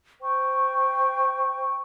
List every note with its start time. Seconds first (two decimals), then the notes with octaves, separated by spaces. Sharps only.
0.21 C5 G5 C#6